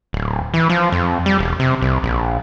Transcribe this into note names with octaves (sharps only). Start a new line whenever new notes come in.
D1
E3
F3
F2
G3
E1
C3
C2
A#1